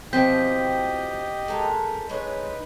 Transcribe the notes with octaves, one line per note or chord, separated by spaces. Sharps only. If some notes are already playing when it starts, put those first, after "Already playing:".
B2 E3 F3 C4 G4 D#5 G6 B6
G#3 A4 A#4
G#3 D#4 B4 C#5